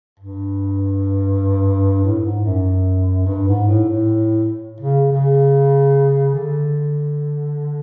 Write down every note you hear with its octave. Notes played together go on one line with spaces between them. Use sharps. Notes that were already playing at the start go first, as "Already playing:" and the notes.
G2
A2
G#2
F#2
G2
G#2
A2
A2
C#3
C#3
D3